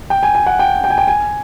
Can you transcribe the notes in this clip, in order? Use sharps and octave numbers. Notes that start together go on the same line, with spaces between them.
G5
G#5
G#5
F#5
G5
G5
G#5
G5
G#5